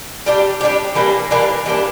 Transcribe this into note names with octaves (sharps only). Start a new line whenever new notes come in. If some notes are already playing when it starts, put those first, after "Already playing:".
G3 D4 G4
G3 D4 G4
E3 G3 A#3 D4
E3 G3 A#3 D4
E3 G3 A#3 D4